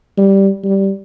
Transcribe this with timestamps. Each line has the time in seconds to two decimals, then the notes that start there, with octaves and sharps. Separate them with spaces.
0.18 G3
0.64 G3